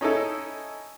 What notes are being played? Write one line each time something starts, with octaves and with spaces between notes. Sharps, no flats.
C#4 D#4 E4 A4